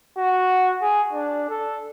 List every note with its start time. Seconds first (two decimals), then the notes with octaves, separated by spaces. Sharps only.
0.17 F#4
0.82 G#4
1.12 D4
1.49 A4